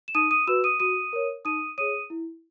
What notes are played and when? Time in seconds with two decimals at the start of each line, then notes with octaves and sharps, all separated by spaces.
0.08 E7
0.15 D#4 D#6 D#7
0.31 D#6 D#7
0.47 F#4 B4 E6 E7
0.64 D#6 D#7
0.80 F#4 D#6 D#7
1.13 A#4 C#5
1.45 D#4 D#6 D#7
1.78 G#4 C#5 D#6 D#7
2.10 E4